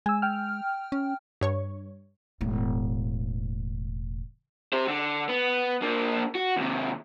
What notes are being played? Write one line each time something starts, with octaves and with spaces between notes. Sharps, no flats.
G#3 G#5 E6
G5 F6
C#4
G2 C#5 C#6
E1 A2
G4 C5
D3
B3
A#3 D4
F#4
D#2 C3